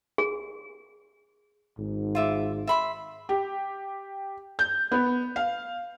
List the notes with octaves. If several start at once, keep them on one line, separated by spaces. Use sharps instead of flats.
G#4
G#1 G#2
F4 E5 D6
E5 B5 C6
G4
G6
B3
F5